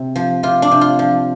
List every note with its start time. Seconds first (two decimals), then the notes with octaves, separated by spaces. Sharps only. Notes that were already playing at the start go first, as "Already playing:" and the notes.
Already playing: C3
0.16 F3
0.43 C3 F4
0.62 D4
0.71 C3
0.81 F4
0.99 F3